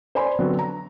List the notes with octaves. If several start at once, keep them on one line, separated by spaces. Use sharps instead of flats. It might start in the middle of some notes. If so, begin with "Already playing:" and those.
C5 D5 G#5 B5 C6
D3 F#3 B3 C4 F#4
A#5